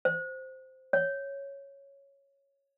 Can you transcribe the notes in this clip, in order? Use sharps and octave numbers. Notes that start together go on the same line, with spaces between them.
C5
C#5